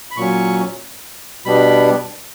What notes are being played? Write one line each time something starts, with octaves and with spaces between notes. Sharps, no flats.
B5
A#2 F#3 C#4 C#6
B2 G3 B3 D4 B5